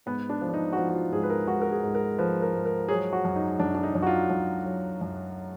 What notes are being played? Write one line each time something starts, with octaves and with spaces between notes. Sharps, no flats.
G#2 B3
D4
F3
D4
D#4
F#4
F3 F4
F#4
F4
G#2 G#4
B4
A#4
G#2 F#4
A#4
G#4
G#2
A#4
F3 B4
A#4
G#2
A#4
F#3 G#4
F#4
F#2
D#4
F#2 D4
D4
D#4
F#2
F#4
F4
F#2
F#3
F#2